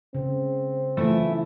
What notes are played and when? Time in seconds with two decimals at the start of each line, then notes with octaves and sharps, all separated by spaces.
0.15 C#3 C4
0.97 E3 A3 E4 F4